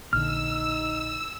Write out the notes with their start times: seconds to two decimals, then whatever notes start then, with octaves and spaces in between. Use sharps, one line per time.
0.13 A#1 D3 D#4 E6 F6